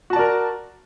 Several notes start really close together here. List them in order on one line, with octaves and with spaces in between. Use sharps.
F#4 A5 D5 A#4